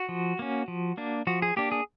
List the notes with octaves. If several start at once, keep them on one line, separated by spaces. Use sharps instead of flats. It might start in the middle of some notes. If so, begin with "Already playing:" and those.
Already playing: F#4
F3
A#3 C#4
F3
A#3 D4
F3 F#4
G#4
A#3 D4 G4
G#4